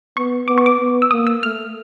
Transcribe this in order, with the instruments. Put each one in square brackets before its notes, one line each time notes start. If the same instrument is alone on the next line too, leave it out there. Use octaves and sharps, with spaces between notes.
[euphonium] B3 [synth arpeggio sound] C#6
[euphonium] B3 [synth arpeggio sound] D6
[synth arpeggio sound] C#6
D6
[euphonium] B3
[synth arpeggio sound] E6
[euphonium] A#3 [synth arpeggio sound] D#6
[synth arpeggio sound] E6
[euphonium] A3 [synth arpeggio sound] F6